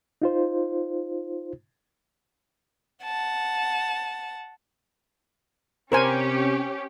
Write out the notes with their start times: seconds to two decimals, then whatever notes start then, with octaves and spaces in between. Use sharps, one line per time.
0.22 D#4 F4 C5
3.04 F#5 A5
5.92 C3 C#4 G4 A#4 C5 G#5